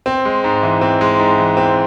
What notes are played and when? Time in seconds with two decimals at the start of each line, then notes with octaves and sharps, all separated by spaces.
0.06 C4
0.25 G#3
0.44 G#2
0.63 E3
0.81 C4
1.01 G#3
1.19 G#2
1.38 E3
1.57 C4